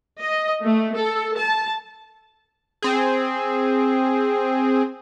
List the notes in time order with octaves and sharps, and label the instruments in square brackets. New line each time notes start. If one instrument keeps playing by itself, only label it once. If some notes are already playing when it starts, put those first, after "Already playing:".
[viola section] D#5
A3
A4
A5
[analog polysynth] C4 G#4